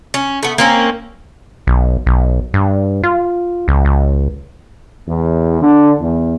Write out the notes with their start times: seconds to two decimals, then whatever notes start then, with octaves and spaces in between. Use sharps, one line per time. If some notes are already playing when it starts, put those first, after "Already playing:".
0.14 C#4
0.43 A3 B3
0.58 A#3 C4 C#4
1.67 B1
2.06 B1
2.54 G2
3.03 F4
3.68 C#2
3.85 C#2
5.07 E2
5.61 D3
6.00 E2